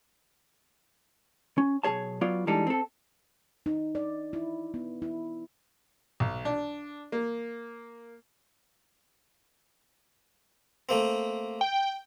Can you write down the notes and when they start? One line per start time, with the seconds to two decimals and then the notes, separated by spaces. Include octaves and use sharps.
1.58 C#4
1.83 B1 C#3 G#4 C#5 A5
2.21 F#3 B3 F4 D5
2.47 E3 G3 G#3 D4 D#4 A4
2.67 C4 A4
3.66 D#4
3.95 D5
4.33 E4
4.74 B3
5.02 E4
6.20 B1
6.45 D4
7.12 A#3
10.89 A3 A#3 C4
11.61 G5